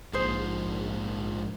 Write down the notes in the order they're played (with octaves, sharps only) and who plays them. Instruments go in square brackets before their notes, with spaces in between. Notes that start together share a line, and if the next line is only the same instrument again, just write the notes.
[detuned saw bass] A#1 [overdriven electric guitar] G#2 F3 [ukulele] G#4 C5